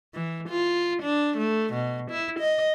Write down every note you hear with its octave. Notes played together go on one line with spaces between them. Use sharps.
E3
F4
D4
A3
B2
E4
D#5